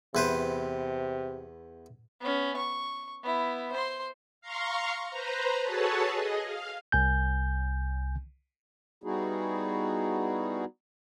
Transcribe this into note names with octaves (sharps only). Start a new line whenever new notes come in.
E2 C3 B4 C5
B3 C#4
C#6
B3 E4
C5 C6
F5 A#5 C6 C#6
B4 C5 A#5
F#4 G#4 A4 B4 C#5 A5
G#4 D#5
F5
C2 G#5 G6
G3 B3 D#4 E4 F#4 G#4